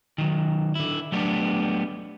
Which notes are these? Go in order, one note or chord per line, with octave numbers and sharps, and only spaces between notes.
D#3 F#3
D3 E4
F#3 G3 A3 B3 D4